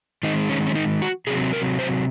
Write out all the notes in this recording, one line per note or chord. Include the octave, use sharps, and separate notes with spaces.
D#3 G#3 C4 D#4
C#4
C#4
D#4
F#4
C3 F#3 C4 G#4
A#4
C5